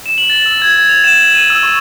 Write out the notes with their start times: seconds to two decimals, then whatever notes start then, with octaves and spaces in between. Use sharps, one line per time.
0.06 E7
0.18 F#7
0.30 A6
0.46 E6
0.62 G#6
0.76 G#6
0.89 F7
1.04 E7
1.20 F#7
1.34 D#7
1.50 E6
1.63 C#6